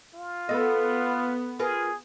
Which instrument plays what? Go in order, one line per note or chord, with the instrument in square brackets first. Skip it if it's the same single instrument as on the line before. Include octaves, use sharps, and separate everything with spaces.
[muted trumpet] F4
[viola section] B3 [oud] A4 D#5
[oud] F4 A#4 B4 [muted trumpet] G#4